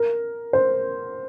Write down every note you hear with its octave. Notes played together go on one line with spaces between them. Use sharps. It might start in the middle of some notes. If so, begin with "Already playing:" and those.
Already playing: A#4
C5